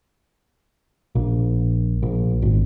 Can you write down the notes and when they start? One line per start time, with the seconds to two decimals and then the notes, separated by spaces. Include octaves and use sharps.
1.15 A#1
2.03 A#1
2.42 G#1